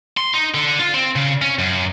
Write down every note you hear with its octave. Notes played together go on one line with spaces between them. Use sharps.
C6
D#4
D3
F4
C4
C#3
C#4
F#2